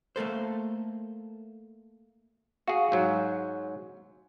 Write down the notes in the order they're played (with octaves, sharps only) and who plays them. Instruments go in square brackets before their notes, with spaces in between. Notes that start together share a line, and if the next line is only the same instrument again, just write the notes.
[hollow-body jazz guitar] A3 A#3 A4 C5
[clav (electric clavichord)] F#4 G#4 [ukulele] F5
[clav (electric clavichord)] G#2 F#3